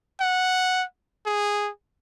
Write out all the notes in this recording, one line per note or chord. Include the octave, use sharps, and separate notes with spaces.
F#5
G#4